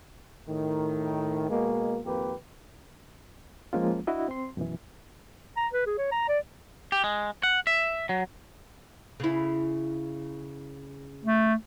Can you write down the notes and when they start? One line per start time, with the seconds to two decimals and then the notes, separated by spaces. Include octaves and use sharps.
0.48 A2 D#3
1.50 B2 G#3 A#3
2.05 G#1 F2 A#3 G4 B4
3.73 F3 G#3 A#3 C#4 F4
4.07 D4 E4 F#4 D#5
4.28 C4 C6
4.57 F#2 B2 E3
5.57 A#5
5.73 B4
5.86 G#4
5.98 C#5
6.12 A#5
6.28 D5
6.92 G4
7.04 G#3
7.43 F#5
7.67 E5
8.09 F#3
9.20 C#3 E4
11.25 A3